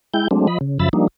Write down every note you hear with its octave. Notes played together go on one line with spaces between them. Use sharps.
G#3 E4 G5 G6
F#3 G#3 A3 C4 D4
F3 D#5 B5
C#3
F#2 C#3 F3 E5 B5 A6
F3 G3 A#3 D4 D#4